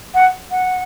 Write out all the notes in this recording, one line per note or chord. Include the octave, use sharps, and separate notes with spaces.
F#5
F#5